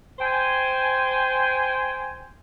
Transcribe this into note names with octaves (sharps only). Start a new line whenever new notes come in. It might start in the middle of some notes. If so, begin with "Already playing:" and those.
C5 G5 G#5